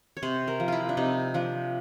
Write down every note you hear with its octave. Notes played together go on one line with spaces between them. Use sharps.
C#5
C3 C5
A#4
F3
E4 F4
D4
C3 D#4
F3 D4